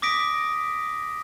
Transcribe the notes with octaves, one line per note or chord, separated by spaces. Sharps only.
D6 D#6 A#6 B6 D7